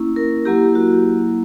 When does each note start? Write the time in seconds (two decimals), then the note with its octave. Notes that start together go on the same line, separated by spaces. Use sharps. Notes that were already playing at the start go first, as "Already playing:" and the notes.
Already playing: A#3 C#4 E4
0.16 A#4
0.45 F#3 A#3 E4 G4
0.75 F#4